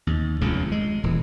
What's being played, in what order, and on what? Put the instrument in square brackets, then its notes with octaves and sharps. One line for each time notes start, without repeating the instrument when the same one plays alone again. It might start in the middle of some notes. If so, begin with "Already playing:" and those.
[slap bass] D#2
F1 C#2 G2 C#3
G#3
D#1 E3